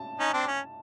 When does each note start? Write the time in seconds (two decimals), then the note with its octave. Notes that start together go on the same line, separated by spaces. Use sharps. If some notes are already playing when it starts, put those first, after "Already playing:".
Already playing: A5
0.19 C#4 D#4
0.33 C4 D4
0.47 C#4